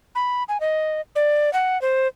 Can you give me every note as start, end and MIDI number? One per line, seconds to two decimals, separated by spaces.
0.15 0.43 83
0.49 0.60 80
0.60 1.01 75
1.16 1.52 74
1.53 1.80 78
1.82 2.07 72